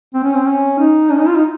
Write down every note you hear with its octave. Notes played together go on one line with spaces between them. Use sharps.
C4
C#4
C4
C#4
D#4
C#4
D#4
F4
D#4